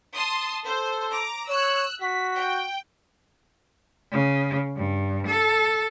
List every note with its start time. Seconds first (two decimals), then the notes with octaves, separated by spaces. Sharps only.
0.13 A5 C6 D#6
0.66 A4 C5
1.11 A#5 D6
1.49 C#5 E6 F#6
2.01 F#4 B6
2.36 G5
4.12 C#3
4.76 G2
5.27 A4